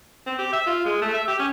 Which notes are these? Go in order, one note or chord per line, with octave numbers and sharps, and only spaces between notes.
C4
G4
E5
F4
G#3
A3
E5
G4
C#4